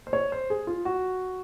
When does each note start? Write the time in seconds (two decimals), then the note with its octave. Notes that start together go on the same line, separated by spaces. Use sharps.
0.07 C5
0.13 C#5
0.32 C5
0.50 G#4
0.67 F4
0.85 F#4